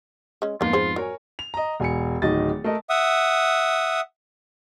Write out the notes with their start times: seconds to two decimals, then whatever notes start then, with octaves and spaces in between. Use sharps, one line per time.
0.42 G#3 C#4
0.61 F2 G#2 A#3 B3 D#4 F4
0.73 G#4 B4 C5
0.96 F#3 A#4 C#5 G#5
1.39 F7
1.54 D#5 A#5
1.80 E1 G#5 C#7
2.22 D1 D#3 D#5 A6
2.64 A3 A#4 D#5
2.90 E5 F#5 D#6